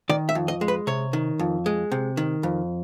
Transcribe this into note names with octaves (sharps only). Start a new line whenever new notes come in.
D#3 D5
E5
F2
D#5
G#3
B4
C3 C#5
D#3
F2
G#3
C3
D#3
F2